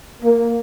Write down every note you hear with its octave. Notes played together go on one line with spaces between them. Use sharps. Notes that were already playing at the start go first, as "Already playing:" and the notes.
A#3